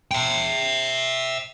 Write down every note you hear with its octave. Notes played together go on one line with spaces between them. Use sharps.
E5 G5